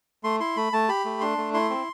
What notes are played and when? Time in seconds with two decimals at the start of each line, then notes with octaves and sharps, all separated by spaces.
0.24 A3 C6
0.40 E4 C6
0.56 A3 B5
0.73 A3 A5
0.89 G4 B5
1.05 A3
1.21 D4 C6
1.38 A3
1.54 E4 C6
1.70 C4